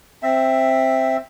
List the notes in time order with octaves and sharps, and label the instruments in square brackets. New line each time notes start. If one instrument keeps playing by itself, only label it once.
[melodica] C4 E5